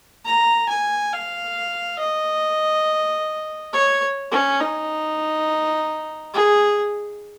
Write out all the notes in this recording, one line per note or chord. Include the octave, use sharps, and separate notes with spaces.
A#5
G#5
F5
D#5
C#5
C#4
D#4
G#4